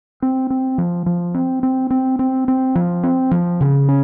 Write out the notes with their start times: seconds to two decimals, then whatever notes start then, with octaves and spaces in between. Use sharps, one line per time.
0.22 C4
0.50 C4
0.78 F3
1.06 F3
1.34 C4
1.63 C4
1.90 C4
2.19 C4
2.48 C4
2.75 F3
3.03 C4
3.31 F3
3.61 C#3
3.89 C#4